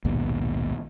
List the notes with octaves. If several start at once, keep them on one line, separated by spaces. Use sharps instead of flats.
A#1 D#2 G#2 B2